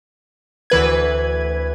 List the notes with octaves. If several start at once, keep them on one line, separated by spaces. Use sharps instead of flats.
D2 E3 B4 G#6